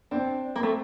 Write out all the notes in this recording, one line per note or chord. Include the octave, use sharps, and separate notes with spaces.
C4 D4
A#3 C4
A3